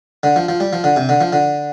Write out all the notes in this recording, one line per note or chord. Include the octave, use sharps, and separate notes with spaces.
D3
F3
F3
G3
F3
D3
C3
D3
F3
D3